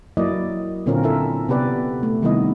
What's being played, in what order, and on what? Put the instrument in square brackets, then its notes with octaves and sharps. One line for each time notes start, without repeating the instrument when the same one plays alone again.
[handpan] F#3 A#3 E4 D5 D#5
A#2 D3 C4 C#4 F4 A#4
E4 F4 A4 A#4 E5
C3 B3 G4 B4 D5
A3
C3 D#3 G3 B3 E4 D#5